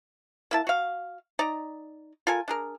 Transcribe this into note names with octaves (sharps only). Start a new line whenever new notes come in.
A#3 E4 A5
F#4 F5
D#4 D5 A#5
F4 A4 A#4 G#5
D4 G#4 A#4